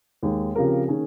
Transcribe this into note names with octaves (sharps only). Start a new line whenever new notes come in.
D#2 D#3 G#3
C#3 F3 C4 G4 A#4
D#3 A#3 C#4 G#4